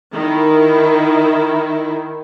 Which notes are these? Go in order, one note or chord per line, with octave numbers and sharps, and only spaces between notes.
D#3 E4